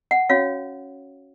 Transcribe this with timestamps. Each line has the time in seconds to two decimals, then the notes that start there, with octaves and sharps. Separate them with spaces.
0.11 F#5
0.29 C#4 F#4 C#5 F5